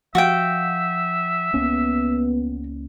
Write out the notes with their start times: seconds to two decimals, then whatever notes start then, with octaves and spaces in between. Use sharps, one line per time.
0.15 F3 F#4 E5 F5 G5
1.54 C#2 A#3 B3 C#4